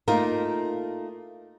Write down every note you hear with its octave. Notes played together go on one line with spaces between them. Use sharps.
A3 A#3 D#4 F4 A#4